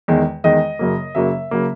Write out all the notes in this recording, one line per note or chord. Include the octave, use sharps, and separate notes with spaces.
E2 D#3 G#3
E2 D#3 G#3 D#5
F#2 C#3 F#3 A#3
F#2 C#3 F#3 A#3 E5
C#3 F#3 A#3